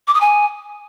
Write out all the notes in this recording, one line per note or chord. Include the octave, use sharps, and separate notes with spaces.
D6
D#6
G#5